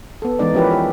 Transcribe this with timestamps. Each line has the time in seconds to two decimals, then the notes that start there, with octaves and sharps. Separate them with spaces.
0.22 B3 A4
0.39 E3 G#3 B3 D#4 D5
0.54 F3 C#4 E4 G4 A#4 B4
0.71 G4